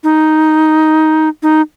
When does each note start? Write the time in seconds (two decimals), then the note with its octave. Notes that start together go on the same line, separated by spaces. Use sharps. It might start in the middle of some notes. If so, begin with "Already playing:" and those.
0.04 D#4
1.43 D#4